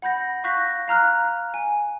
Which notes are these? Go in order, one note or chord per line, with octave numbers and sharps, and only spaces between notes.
F#5 B5 G6 A#6
F5 C#6 F#6 G6 A#6 B6
F5 A#5 F6 F#6
G#5